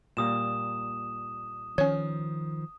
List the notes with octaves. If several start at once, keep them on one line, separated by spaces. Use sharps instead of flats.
A#2 G3 A#3 D#6 E7
D#3 F3 C#4 C#5